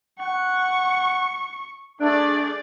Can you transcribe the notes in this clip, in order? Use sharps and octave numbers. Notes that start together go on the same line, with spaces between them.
F#5 C#6
A3 D4 G#4 D5